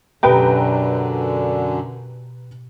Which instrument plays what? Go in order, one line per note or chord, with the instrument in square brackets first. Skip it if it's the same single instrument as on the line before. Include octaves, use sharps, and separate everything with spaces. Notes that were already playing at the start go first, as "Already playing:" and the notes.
[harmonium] F#2 D3 [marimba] B2 G4 [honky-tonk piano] B4 G5 A#5